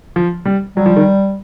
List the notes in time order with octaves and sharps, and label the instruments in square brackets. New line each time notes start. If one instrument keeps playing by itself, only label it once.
[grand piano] F3
G3
[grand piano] F#3 [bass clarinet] G3
[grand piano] F3
D#3